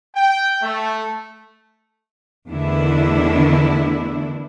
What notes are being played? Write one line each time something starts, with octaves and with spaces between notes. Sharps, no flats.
G5
A3
E2 D3 D#3 A3 D4 E4